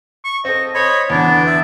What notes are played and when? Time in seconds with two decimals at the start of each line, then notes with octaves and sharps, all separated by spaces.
0.24 C#6
0.45 C4 A4 D#5
0.75 C5 C#5 D#5 B5
1.10 E2 D3 B3 D4
1.47 E5